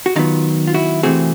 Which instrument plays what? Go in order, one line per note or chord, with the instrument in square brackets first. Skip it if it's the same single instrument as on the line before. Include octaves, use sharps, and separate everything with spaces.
[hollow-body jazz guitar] F#4
D#3 F#3 B3 D#4 F4
F4
E4 F#4
C3 E3 A3 C4 F#4 G#4